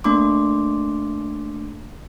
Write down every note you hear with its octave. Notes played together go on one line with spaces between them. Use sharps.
A3 A#3 D4 C6 D6